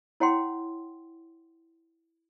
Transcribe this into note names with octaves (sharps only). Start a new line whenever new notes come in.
E4 C#5 F#5 G5 C6